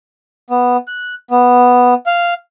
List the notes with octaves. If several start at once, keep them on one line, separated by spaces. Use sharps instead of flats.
B3
F#6
B3
F5